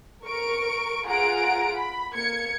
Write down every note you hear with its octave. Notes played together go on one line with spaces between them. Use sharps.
A#4 C#6 D7
F4 G#4 F#5 A#5 D7
B5
A#3 G#6 C#7